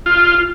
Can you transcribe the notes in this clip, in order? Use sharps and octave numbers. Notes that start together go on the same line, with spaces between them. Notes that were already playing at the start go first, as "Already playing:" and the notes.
F4